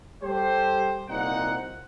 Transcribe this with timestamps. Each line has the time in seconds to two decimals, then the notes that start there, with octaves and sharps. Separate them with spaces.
0.23 G3 G4 A4 C5
1.08 C2 A#2 D#4 C5 F#5